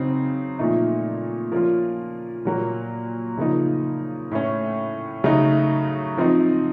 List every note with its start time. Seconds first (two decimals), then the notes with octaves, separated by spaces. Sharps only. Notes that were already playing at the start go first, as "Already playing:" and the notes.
Already playing: C#3 F#3 C4 D#4
0.59 A#2 F3 A3 D#4
1.52 F3 A#3 C#4 F4
2.45 A#2 F#3 A#3
3.38 C#3 F3 A#3 D#4
4.32 A2 A3 C#4
5.24 C#3 F#3 A3 D#4
6.17 F3 C4 D#4